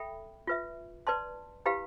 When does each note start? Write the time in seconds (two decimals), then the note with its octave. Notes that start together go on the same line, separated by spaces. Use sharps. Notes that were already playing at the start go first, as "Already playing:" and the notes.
Already playing: A4 E5 G5 B5
0.47 F4 B4 E5
1.07 B4 D5 A5 C6
1.66 E4 G4 B4 F5 B5